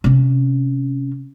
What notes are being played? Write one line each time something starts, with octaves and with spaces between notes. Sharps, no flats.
C3 C#4